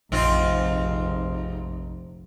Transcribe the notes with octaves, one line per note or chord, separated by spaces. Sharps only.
F1 A#1 G#2 C4 F4